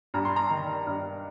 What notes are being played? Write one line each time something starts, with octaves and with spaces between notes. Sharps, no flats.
G2 A#5
C6
A#5
D#3
G2